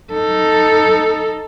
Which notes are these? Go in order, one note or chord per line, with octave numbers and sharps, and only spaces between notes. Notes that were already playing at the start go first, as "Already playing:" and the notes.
D#4 A4